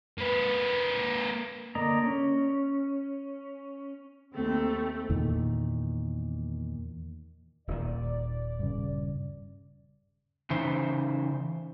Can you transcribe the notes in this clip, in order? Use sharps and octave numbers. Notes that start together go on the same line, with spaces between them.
A#3 B4
D3 A#3 D5 D#5 A#5
C#4
D#2 A3 C4
E2 A#2 D#3
D#1 A#2 D#3 D5
G2 C#3
C#3 E3 D#4 C5 E5